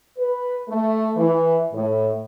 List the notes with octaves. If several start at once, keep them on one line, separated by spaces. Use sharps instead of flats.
B4
A3
E3
A2